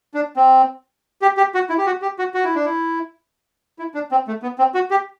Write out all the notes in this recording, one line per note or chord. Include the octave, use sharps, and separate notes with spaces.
D4
C4
G4
G4
F#4
E4
G4
F#4
G4
F#4
F#4
E4
D4
E4
E4
D4
C4
A3
B3
C4
F#4
G4